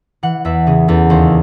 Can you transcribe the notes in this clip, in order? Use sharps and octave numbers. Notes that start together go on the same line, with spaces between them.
E3 F#5
E2 E5
C#3 G#4
E2 A4
D#2 C5